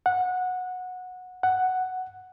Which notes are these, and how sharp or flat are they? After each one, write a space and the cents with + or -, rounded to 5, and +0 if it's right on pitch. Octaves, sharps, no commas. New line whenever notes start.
F#5 -15
F#5 +5